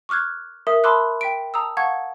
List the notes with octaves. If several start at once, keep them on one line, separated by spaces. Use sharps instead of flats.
C#6 D6 F6 F#6 G#6
A#4 E5 D#6
A5 B5 C6 D6 E6 F#6
G5 B6 D7
A5 A#5 D#6 E6
F5 F#5 A5 C#6 G#6